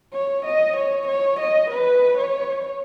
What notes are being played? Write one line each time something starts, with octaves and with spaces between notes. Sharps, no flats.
C#5
D#5
C#5
C#5
D#5
B4
C#5